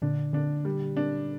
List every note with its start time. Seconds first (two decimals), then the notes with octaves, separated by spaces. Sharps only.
0.02 A#2 D3 D4
0.33 A#2 D3 D4
0.65 G3
0.97 D4